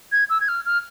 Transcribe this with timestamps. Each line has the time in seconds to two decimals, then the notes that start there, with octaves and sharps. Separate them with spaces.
0.12 G#6
0.30 E6
0.41 G#6
0.48 F6
0.66 F6